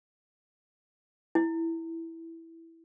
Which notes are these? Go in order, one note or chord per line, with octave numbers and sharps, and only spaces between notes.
E4